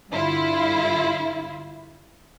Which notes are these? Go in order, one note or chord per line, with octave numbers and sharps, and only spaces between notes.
G2 D3 E4 F4